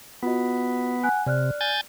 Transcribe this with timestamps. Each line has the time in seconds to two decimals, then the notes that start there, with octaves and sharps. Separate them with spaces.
0.23 B3 F4 F#4 D#5
1.03 F#5 G#5 F#6
1.26 C3 D5 F6 F#6
1.61 G#5 G6 A6